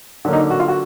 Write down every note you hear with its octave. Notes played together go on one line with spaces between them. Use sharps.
D3 F#3 A#3
D#4
F#4
F4
F#4